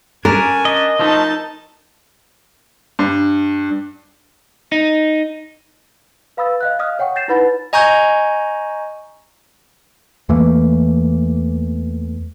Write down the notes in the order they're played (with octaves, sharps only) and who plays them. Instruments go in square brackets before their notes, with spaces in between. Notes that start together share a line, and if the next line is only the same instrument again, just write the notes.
[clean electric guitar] C#4 D4 [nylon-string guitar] A#4 [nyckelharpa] G#5
[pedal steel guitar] D#5
[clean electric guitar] F3 A3 [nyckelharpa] D#4 A5
[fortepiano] G2
[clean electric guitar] D#4
[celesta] B4 F5 B5 D#6 E6 A6
D#5 F5 F#6
D#5 F5 D#6 F6
C#5 F#5 G5 C#6
G6 A6 A#6 C7 E7
D#4 E4 B4 F#5 B5 A6
[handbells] D#5 G#5 A#5 C#6 G6 G#6
[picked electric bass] E2 E3 A3 A#3